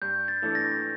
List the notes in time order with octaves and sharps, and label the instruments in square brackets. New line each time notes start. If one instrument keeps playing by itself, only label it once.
[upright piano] G2 [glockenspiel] G6
[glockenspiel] A6
[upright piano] E3 A3 D4 A4
[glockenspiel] A#6